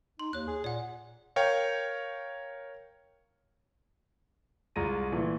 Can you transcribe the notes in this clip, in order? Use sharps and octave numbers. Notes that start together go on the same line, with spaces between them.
D#4 C6
D#2 C#5 F#6
G#4
A#2 D5 F#5
A#4 C#5 F5 G5
C2 G#3 F4 A#5 A#6 D#7
A#2 E3 A3